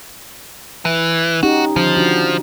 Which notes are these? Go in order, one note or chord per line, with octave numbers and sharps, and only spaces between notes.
E3
C#4 D#4 F#4 G4
D3 D#3 F3 C#4
D4 F#4